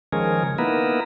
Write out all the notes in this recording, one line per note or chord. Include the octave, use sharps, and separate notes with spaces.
D#3 F3 G#3 C#4 G#4 A#4
C#3
A#3 B3 D#4 E4 A#4 B4